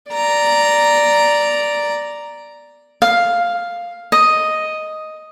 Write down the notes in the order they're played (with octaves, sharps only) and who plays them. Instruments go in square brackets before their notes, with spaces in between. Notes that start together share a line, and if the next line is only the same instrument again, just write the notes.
[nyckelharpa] D5 A#5
[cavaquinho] F5
D#5